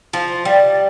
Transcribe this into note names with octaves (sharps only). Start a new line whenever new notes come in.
F3
G3